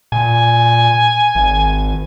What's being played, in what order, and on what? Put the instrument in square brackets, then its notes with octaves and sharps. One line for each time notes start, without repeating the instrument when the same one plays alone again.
[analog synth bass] A#2 [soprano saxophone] G#5
[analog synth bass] G#1